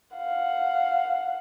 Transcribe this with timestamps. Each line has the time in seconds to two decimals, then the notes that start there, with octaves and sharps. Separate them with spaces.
0.16 F5 F#5